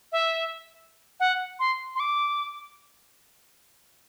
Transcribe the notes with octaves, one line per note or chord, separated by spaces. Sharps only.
E5
F#5
C6
C6
D6